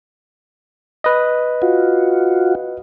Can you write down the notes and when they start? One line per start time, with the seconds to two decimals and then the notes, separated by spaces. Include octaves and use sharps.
1.04 B4 D#5
1.62 F4 F#4